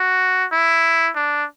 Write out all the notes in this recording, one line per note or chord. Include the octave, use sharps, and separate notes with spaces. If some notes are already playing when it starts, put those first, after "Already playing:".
Already playing: F#4
E4
D4